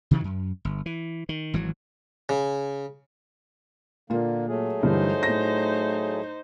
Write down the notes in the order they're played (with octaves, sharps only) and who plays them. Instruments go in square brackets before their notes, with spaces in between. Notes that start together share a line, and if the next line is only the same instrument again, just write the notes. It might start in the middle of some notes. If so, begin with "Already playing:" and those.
[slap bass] C3 D#3 E3 F#3
F#2
G1
E3
D#3
G#1 E3 F#3
[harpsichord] C#3
[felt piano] A#2 F4 [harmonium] D3 A#3
[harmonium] F#3 A3 G#4
[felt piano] G2 D3 E3 [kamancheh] D#4 C5
[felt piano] A2 A#6